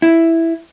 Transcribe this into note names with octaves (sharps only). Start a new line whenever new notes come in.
E4